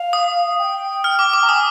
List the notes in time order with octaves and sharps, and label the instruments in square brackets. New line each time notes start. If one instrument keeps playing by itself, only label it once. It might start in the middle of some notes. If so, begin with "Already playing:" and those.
Already playing: [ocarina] F5
[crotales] D#6
[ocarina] G5
[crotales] F6
D6
D6
[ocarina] A#5
[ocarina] G#5 [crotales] D#6